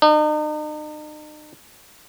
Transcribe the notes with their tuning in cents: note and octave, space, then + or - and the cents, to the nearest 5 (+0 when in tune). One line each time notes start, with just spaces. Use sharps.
D#4 -40